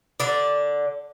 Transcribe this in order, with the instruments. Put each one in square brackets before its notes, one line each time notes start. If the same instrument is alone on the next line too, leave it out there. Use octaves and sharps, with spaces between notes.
[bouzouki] D3 D5